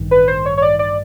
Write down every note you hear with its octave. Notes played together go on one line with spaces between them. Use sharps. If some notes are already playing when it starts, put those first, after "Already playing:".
Already playing: A1 G2 D#3
B4
C5
C#5
C#5
D5
D5